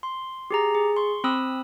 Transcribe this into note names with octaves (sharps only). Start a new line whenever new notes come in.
C6
G4 G#4 A#5
G#4
C6 C#6
C4 B5 D#6 E6